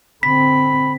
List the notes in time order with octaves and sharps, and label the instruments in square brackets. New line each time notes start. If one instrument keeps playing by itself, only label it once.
[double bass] D3 C4 [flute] B5 [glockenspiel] B6